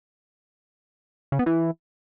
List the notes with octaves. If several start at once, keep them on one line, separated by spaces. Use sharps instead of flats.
C#3
B3
E3